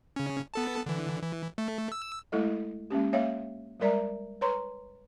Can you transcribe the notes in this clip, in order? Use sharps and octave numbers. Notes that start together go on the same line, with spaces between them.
C#3 C#4
B3 A4 A5
D3 E3
E3
A3
E6
G#3 A3 E4 A4 D#5
G#3 A#3 C#4 G4
A#3 C#5 E5 F5
G3 G#3 A#4 D5 E5 A#5
B4 C#5 A#5 C6 C#6